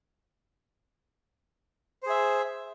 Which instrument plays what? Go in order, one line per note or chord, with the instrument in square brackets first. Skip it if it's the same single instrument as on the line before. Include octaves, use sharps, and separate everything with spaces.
[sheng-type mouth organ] C5
G#4
E5